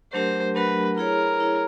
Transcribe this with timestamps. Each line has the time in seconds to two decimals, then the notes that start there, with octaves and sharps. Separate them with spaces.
0.14 F#3 A3 D4 G4 A#4 C5
0.56 F#3 A3 D4 G4 A#4 B4
0.98 E4 G#4 A#4 C#5
1.40 E4 G#4 C#5